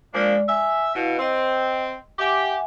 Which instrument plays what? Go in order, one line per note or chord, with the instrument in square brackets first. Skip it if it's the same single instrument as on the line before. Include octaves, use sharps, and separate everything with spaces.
[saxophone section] F3 A#3 D4 [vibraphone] G#3 D5
[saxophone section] E5 [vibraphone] G#5
[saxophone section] B2 [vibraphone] E4 F5
[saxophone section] C4 [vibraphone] D#5 G5
[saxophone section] G4 [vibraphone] E5 F#5 G#5